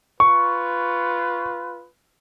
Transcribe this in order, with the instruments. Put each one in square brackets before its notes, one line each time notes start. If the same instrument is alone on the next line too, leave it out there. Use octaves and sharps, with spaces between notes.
[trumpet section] F4 B4 [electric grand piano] C#6